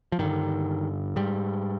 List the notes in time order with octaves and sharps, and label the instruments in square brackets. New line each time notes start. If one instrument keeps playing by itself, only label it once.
[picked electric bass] F3
G2 D3 D#3
G#2 G3